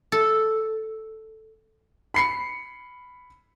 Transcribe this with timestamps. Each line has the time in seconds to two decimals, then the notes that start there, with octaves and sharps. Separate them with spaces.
0.12 A4
2.14 B5 C7 C#7